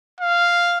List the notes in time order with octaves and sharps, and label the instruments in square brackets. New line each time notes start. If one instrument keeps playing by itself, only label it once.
[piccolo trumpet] F5